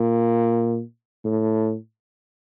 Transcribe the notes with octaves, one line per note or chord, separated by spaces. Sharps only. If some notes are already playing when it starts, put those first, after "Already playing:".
Already playing: A#2
A2